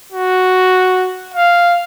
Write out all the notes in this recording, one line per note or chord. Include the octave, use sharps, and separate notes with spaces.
F#4
F5